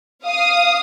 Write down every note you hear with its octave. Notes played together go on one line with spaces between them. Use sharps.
F5 D#6